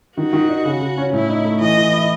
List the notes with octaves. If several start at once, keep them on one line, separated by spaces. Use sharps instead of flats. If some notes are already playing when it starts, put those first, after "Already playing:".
D#3 F#4
D#3
D#4
C#3
C#3
C#4
A2 E4
D#4
A3
E3 D#5
E3
E4